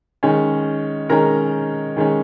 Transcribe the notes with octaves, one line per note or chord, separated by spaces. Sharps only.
D#3 G#3 C#4
D#3 G#3 C#4 A#4 A#5
D#3 G#3 C#4